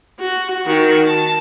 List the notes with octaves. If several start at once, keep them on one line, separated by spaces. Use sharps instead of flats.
F#4
D#3 F#4
A5